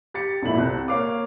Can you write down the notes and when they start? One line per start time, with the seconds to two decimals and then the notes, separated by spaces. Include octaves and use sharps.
0.14 G4 A6 C#7
0.42 G#1 F2 A#2 A3 E4 F#7
0.57 C2 C4 F#6
0.88 A#3 C#5 F5 D6